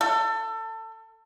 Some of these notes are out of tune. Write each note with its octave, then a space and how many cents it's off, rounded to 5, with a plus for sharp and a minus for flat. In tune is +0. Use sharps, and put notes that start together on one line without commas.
A4 +25